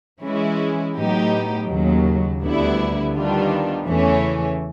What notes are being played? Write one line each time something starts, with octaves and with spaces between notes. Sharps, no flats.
E3 G#3 C#4 E4
A2 F#3 B3 D#4 G4
D#2 C#3 F#3
D2 D3 G3 B3 E4
D#3 G3 B3 D4 F4
E2 C#3 E3 A3 C#4